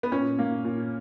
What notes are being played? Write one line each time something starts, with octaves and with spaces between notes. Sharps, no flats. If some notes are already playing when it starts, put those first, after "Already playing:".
B3
A#2 C#4
A#2 A#3
A#2